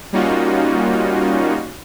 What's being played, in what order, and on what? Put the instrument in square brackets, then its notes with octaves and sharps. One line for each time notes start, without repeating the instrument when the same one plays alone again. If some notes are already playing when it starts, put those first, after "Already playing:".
[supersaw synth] G3 A#3 C#4 D#4 F4 F#4